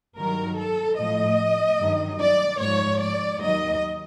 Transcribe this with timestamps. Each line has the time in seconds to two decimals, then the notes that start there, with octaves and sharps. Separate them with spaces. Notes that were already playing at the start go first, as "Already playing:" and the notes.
0.18 G2 D#3 F#3 A#4
0.58 A4
0.99 A2 F3 D#5
1.79 G2 D#3 F#3
2.20 D5
2.60 G#2 F3 C#5
3.00 D5
3.41 D#2 D#3 F#3 D#5